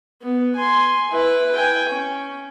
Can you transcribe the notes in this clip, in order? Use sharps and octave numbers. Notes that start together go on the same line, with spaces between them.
B3
G#5 C6
E4 B4
G5 G#5
C#4